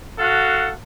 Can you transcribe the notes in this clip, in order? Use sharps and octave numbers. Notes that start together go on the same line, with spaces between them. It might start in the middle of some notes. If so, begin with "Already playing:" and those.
F#4 A4 F5 F#5